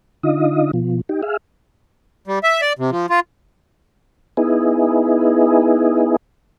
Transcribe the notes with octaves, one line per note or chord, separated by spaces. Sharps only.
D3 D#4 F4 D#5
B2 F3
D#4 G4
G#4 E5 F5
G3
E5
D5
C3
F3
F4
B3 D#4 E4 G#4